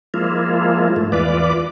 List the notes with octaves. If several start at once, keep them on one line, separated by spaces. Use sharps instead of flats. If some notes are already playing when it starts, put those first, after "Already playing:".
F3 G#3 A#3 E4 F4
G#2 A3
E2 E3 F4 B4 D5 D6